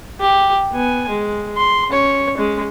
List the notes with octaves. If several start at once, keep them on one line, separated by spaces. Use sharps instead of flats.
G4
B3 G#5
G#3
C6
C#4 C#5
G#3 C#4